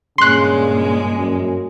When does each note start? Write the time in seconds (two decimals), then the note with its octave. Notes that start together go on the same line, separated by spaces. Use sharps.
0.18 G2 A#2 C#3 G#3 C6 F#6
1.18 F#2